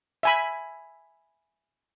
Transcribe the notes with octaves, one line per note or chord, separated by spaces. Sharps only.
E5 G#5 B5